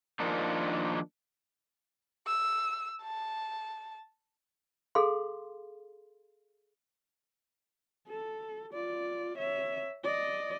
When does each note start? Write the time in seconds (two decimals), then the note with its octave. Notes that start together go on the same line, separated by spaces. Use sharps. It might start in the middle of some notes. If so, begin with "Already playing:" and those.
0.20 D#3 F3 A#3 D4 D#4
2.27 E6
3.02 A5
4.95 G#4 A4 F5 C6
8.08 A4
8.73 F4 D5
9.37 C#5 E5
10.04 D5 D#5